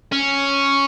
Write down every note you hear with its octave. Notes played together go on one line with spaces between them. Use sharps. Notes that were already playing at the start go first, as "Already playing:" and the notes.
C#4